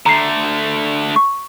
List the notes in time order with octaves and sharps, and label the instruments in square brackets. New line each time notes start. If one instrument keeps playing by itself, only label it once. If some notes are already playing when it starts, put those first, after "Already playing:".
[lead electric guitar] D3 A3 [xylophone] A#5 C7
[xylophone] C#6